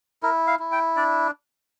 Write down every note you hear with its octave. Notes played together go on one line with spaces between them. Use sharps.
E4 A#4
F5
E4
G5
D4 D5